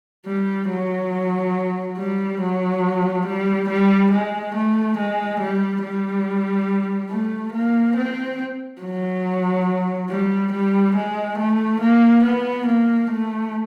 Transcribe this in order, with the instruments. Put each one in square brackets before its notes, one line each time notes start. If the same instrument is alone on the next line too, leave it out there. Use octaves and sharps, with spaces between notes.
[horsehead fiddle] G3
F#3
G3
F#3
G3
G3
G#3
A3
G#3
G3
G3
A3
A#3
C4
F#3
G3
G3
G#3
A3
A#3
B3
A#3
A3